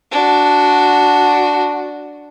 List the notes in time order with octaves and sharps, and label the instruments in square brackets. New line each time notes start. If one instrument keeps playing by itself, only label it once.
[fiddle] D4 F#4